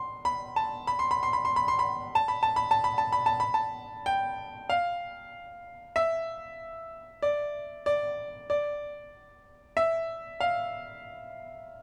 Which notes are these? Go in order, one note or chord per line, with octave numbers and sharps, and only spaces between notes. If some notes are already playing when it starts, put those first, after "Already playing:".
Already playing: C6
B5
A5
B5
C6
B5
C6
B5
C6
B5
C6
B5
A5
B5
A5
B5
A5
B5
A5
B5
A5
B5
A5
G5
F5
E5
D5
D5
D5
E5
F5